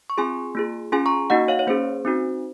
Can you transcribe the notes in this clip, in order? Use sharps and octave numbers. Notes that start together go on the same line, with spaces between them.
C#6
C4 F4 G#4 G#5 C6
A#3 F4 G#4
C#4 F4 G#4 G#5 C6
A#5 C#6
A#3 D#4 F#4 D#5 F#5
C#5 F5
C#5
A#3 C#4 G#4 C5
C4 D#4 F#4